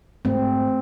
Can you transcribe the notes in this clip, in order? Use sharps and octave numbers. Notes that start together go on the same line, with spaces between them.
G#2 A3 C4